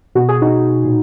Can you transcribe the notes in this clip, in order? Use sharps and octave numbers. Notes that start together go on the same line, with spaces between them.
B2 F#4
G#4
D#4 F#4
A#2